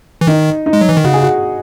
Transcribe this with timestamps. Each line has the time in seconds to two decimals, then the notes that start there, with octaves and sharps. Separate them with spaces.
0.21 E3
0.27 D#3 D#4
0.66 D#4
0.73 G#3
0.81 F#3
0.89 E3
0.97 D#3
1.04 C#3 F#4
1.14 G#4
1.22 F#4